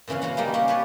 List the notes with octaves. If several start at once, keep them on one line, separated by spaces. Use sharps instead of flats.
A#2 C#3 E3 C#4 F5
C#4 E4 F#4 F5 F#5
G3 A#3 D#4 F5
C#4 G4 F#5
D4 G4 B4 C#5